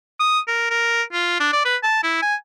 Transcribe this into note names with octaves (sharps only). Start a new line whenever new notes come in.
D#6
A#4
A#4
F4
D4
D5
B4
A5
E4
G#5